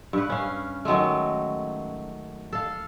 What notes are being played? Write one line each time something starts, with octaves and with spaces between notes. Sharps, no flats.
G2 B4
C#4 F5
D#3 F#3 G#3 A3
A4 F5